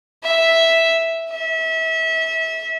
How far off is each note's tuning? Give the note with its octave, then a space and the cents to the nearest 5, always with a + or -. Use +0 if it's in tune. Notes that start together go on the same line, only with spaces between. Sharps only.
E5 -5
E5 -30